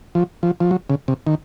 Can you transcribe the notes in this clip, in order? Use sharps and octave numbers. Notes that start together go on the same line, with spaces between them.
F3
F3
F3
F#3
C#3
C3
D#3